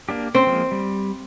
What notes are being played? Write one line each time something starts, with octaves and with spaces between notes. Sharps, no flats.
A#3 D4 G4
C4 C#4 C6
F3 G#3 A#3
G3